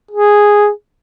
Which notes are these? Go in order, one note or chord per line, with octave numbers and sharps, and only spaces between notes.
G#4